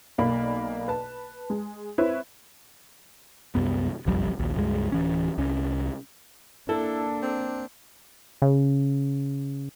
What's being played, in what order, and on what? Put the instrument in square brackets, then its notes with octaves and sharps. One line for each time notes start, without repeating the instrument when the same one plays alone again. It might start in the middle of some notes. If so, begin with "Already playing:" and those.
[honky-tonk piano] B1 A#3 D5 B5
B4 A5
G#3
C4 E4 B4 C#5 E5
[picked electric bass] C2 F#2 B3
F#1 B1 F2 G3
A#1 D#2
C#2 G2 G#3
D1 E3 C#4
C2 C#4
[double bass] A#3 D4 [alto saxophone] E4 [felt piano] A4
[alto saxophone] C4
[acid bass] C#3